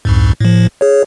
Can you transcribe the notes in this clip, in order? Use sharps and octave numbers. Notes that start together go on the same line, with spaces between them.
C2 F2 G#2
A2 F3
G#4 C#5